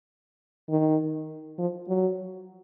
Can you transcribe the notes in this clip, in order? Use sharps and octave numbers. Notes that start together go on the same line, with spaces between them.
D#3
F3
F#3